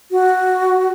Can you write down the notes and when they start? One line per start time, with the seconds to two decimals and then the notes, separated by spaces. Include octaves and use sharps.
0.12 F#4